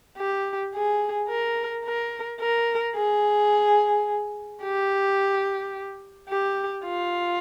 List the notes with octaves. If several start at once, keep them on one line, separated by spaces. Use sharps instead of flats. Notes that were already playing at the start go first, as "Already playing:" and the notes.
G4
G#4
A#4
A#4
A#4
G#4
G4
G4
F4